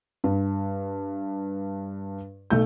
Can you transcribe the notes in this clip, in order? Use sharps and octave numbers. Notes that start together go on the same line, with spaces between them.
G2
B1 A3 G6